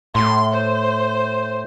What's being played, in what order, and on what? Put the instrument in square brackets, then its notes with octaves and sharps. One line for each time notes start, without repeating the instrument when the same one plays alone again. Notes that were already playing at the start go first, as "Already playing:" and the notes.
[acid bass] A2 [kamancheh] C6
[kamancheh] C5